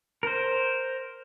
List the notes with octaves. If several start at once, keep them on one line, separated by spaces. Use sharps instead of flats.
A#4 C5